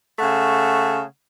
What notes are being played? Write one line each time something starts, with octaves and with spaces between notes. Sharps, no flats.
C#3 A3 F#5